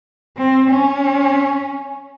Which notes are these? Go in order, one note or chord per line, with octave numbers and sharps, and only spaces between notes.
C4
C#4